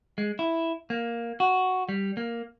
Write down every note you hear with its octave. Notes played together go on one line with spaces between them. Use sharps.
G#3
E4
A#3
F#4
G3
A#3